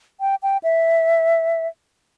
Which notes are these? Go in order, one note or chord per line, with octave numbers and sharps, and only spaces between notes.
G5
G5
E5